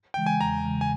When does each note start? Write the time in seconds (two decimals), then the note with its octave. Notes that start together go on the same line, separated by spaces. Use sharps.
0.14 C#3 E3 G#3 G5
0.26 G#5
0.40 E2 A#5
0.65 C#3 E3 G#3
0.81 G#5